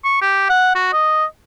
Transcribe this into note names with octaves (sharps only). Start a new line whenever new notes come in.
C#6
G4
F#5
F#4
D#5